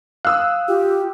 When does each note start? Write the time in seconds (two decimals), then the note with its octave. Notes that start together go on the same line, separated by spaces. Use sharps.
0.25 F5 D#6 E6 F#6
0.68 F4 G4